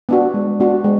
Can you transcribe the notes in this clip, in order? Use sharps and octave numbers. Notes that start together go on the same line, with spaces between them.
B3 D4 F#4
G#3
B3 D4 F#4
G#3